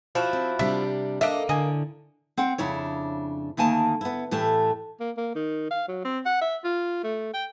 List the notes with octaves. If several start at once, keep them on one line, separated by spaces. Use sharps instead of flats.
F3 E4 F#4
C4
C3 G3 D4 E5
A#3 D4 A4 D#5 E5
A2 D3 D#5 G#5
C4 F#5 G5
F2 C#3 D4 E4 C#5
D2 D#3 A#3 G#5 A5
B3 E4
A2 E3 A3 G4 A5
A#3
A#3
D#3
F5
F#3
C4
F#5
E5
F4
A3
G5